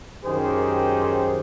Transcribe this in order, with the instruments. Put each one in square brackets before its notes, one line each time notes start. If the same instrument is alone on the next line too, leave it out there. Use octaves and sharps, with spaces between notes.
[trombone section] F#2 D#3 G4 G#4 C5